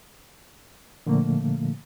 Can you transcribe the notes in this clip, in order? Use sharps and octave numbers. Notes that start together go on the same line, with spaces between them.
A#2 D3 F3 A3 A#3